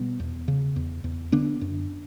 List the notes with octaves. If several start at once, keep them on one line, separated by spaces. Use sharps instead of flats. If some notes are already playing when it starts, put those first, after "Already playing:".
Already playing: B2 G3 B3
E2
C#3
E2
E2
D3 B3 D4
F#2